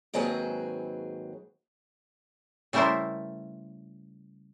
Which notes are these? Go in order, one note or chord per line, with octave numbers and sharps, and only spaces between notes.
D#2 G#2 F#3 C4 G#4 B4
C#3 G3 A3 E4 A#4 C5